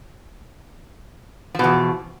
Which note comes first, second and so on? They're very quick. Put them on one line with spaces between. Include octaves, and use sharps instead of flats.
F3 B2 E2